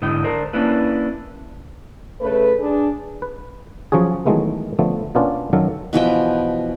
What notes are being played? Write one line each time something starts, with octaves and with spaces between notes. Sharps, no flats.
G#2 D3 E4 D#5 G5
D4 A#4 C5
A#3 C#4 D4 E4 B4
C#3 A3 B4
D4 G#4
B4
F3 F#3 C#4 F#4 G#4
D#3 E3 F#3 G#3 A3 B3
D3 F3 A3 B3
B2 A#3 B3 C#4 D4 F4
F#2 D#3 F#3 A4 F5
B2 E3 F3 G5